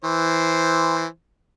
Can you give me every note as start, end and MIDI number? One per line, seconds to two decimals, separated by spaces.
0.04 1.06 52
0.04 1.06 72